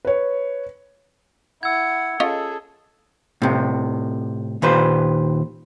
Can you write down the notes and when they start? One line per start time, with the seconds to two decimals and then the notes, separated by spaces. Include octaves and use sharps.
0.05 B4 C#5
1.63 E4 F#5 E6 G#6
2.20 C#4 F4 G#4 A4 D#5
3.42 A2 C3
4.62 D#2 A#2 B4 C5